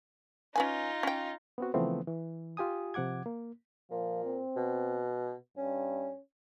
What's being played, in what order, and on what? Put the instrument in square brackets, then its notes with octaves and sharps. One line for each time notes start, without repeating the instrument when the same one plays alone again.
[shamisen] C#4 B4 G#5 [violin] D#4 F4
[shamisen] C#4 G5
[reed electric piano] B3 C4 F#4
C#3 E3 F3 A3 B3 C4
E3
F4 G4 G#5 D#6
C3 F3 F#5 D6 G#6
A#3
[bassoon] A#2 [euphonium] F3
[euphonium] C4
[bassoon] B2
[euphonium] G2 [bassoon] C#4